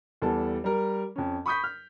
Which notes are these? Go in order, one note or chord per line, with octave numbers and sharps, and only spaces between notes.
E2 G3 A4 A5
G3 A#4
F2 C#4
B5 C#6 D#6 G6 B6
F6